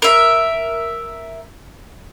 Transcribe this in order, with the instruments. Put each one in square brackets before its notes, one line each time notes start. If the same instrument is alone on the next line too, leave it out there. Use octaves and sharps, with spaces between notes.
[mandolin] A#4 E5